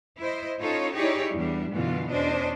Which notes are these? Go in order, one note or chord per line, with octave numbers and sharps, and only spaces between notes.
E4 C5 D#5
C#4 D#4 F4 A4 C#5
D#4 E4 G4 G#4 C#5 D5
E2 G3 D4
F#2 B2 D3 E3 F4
E2 C#4 D4 C5 D#5